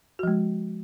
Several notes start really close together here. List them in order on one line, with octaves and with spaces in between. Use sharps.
F#4 F3 G#3